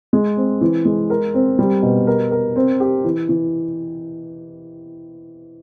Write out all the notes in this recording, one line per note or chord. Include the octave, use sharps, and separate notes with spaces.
G#3
C4
E3
G#3
A#4
C4
G3
B2
A#4
A#4
C4
G4
E3
E3